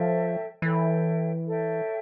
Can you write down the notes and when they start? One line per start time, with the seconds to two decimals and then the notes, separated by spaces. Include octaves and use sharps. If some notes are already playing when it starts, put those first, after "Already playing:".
Already playing: F3 A4 C#5 E5 G5
0.62 E3 A4 C#5 E5 G5
1.48 A4 C#5 E5 G5